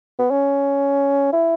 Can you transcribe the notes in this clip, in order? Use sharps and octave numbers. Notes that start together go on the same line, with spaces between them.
B3
C#4
E4